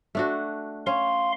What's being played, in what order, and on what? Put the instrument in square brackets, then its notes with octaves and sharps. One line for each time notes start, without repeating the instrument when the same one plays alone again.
[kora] A3 D4 F#4
[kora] C#4 [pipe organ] F5 C6